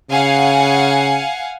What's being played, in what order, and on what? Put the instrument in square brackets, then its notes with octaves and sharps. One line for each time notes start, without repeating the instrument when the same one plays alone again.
[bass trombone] C#3 [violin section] F5 F#5 G#5